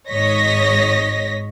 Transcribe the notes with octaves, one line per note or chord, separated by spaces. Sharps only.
G#1 G#2 C#5 D#5 A#6 B6